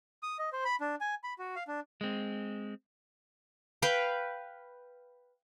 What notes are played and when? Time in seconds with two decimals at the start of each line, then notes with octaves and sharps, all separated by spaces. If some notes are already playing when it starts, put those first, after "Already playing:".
0.23 D#6
0.39 D#5
0.53 C5
0.65 B5
0.81 D4
1.01 G#5
1.24 B5
1.39 F#4
1.56 F5
1.68 D4
2.01 G#3 C4
3.82 B4 F5 G5